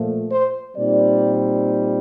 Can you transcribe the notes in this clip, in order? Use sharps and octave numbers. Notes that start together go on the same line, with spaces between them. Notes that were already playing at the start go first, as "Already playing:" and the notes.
Already playing: A#2 F3 A3
C5
A#2 G3 C4 D#4 D5